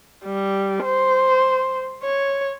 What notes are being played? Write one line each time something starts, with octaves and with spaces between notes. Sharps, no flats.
G3
C5
C#5